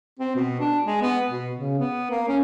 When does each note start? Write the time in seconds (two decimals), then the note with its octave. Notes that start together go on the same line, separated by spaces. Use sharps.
0.19 C4
0.36 B2
0.60 D4
0.85 G#3
1.01 B3
1.29 B2
1.56 C#3
1.79 B3
2.10 A#3
2.28 C#4